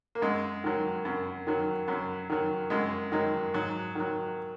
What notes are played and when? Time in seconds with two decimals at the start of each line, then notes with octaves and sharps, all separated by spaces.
0.15 A#3
0.22 F#2 G#3
0.64 D#3 F#3
1.05 F#2
1.47 D#3 F#3
1.88 F#2 F#3
2.30 D#3 F#3
2.70 F#2 G#3
3.12 D#3 F#3 G#3
3.54 G#2 F#3
3.95 D#3 F#3